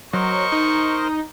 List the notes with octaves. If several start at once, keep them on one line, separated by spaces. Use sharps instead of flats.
F#3 A#4 C5 D#5 C#6
D#4